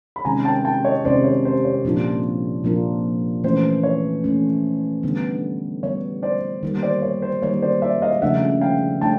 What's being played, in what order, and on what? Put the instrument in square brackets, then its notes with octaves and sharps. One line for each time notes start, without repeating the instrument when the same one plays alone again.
[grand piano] B5
[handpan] C3 D#3 G#3 C#4 [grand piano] G#5 A#5
[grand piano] G5 A5
G5 A5
C#5 D#5
[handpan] C3 D#3 G#3 C#4 [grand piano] C5 D5
[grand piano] C#5
C5
C#5
[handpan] A#2 F3 A#3 D4 F4
A#2 F3 A#3 D4 F4
[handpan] E3 A3 C#4 [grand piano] C5
[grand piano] C#5
[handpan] E3 A3 C#4
D3 G3 B3
[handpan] D3 G3 B3 [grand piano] C#5
[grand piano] C5 D5
[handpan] D#3 G3 A#3
[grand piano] C5 D5
C#5
C5
[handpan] D#3 G3 A#3 [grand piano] C#5
[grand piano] C5 D5
D5 E5
D#5 F5
[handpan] C#3 F3 A3 D4 [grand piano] E5 F#5
[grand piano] F5 G5
[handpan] A3 D4 [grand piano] G5 A5